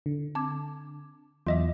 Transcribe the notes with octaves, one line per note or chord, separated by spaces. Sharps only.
D3
C4 A5 D6 G#6
E2 F#3 F4 D#5 E5 D6